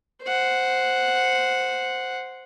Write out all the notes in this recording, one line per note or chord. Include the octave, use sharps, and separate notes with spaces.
C5 F#5